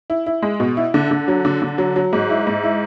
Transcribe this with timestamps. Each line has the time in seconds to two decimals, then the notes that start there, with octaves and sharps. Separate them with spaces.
0.10 E4
0.27 E4
0.42 G#3
0.60 B2
0.77 E4
0.94 D3
1.11 D3
1.28 F#3
1.45 D3
1.62 D3
1.78 F#3
1.96 F#3
2.13 G#2
2.30 E4
2.47 G#2
2.64 E4